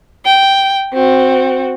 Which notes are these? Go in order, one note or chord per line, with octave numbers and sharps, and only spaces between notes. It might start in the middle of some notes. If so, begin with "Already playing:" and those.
G5
C4 F#4